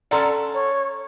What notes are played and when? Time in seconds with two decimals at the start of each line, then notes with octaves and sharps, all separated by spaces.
0.11 C#4 A4 D5 F#5 A#5 C6
0.54 C#5